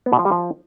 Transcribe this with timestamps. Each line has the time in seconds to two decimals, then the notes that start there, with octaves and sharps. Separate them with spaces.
0.06 B3
0.13 B2
0.19 F3
0.25 G3
0.32 F3